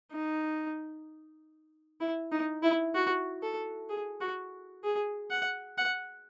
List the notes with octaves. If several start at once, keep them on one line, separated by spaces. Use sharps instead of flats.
D#4
E4
D#4
E4
F#4
A4
G#4
F#4
G#4
F#5
F#5